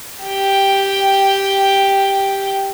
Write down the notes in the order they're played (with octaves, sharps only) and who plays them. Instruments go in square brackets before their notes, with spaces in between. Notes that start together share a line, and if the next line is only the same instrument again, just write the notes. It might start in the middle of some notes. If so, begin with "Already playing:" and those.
[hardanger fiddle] G4 G5